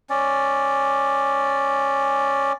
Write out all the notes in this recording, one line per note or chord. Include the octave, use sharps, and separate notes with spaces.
C#4 D5